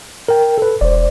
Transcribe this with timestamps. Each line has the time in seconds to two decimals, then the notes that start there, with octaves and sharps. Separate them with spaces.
0.28 A#4 G5
0.58 A4 B4
0.81 E1 C5 D5